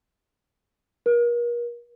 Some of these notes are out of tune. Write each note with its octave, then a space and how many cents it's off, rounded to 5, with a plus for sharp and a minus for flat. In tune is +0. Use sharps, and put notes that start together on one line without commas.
A#4 +35